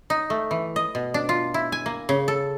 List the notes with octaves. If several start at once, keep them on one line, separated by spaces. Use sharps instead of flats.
D#4
A3
E3
D#5
B2
D4
F4
E4
G#5
A#3
C#3
A4